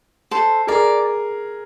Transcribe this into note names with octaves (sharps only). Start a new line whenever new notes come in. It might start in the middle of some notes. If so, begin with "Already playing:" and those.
A4 C5
G#4 A#4 D5